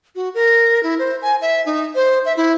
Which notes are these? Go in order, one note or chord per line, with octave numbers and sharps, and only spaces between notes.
F#4
A#4
E4
C5
G#5
E5
D#4
C5
E5
E4